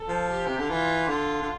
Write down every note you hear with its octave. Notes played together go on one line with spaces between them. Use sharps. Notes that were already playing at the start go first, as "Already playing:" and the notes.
Already playing: A4
F3
G4
C3
D3
E3 F4
D3 F4
D3